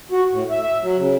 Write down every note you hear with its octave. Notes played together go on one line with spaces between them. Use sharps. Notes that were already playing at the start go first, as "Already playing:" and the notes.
F#4
A2
E5
E5
F#3
C#3